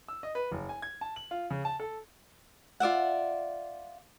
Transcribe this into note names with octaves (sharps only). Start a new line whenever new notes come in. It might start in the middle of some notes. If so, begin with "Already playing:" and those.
E6
D#5
B4
F#1
G#5
G#6
A5
F#7
F4
C#3
A5
A4
F4 D5 E5 F#5